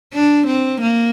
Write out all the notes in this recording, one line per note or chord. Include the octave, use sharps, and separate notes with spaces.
D4
C4
A#3